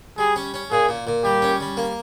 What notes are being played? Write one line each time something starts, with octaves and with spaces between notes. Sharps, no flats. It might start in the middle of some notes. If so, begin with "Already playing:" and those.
G3 G#4
C#4
C#4
A#2 G#4
A#2
A#2
G3 G4
C#4
G3
A#3